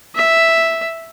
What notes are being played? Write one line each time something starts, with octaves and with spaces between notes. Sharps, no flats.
E5